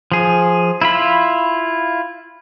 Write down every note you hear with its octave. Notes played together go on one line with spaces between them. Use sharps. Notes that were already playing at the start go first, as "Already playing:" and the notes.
F3 G#4
E4 F4 B5